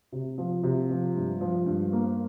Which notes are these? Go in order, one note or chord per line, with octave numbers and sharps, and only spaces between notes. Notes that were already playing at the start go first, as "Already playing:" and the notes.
C3
F3
C3
F3
G2
F3
G2
A#3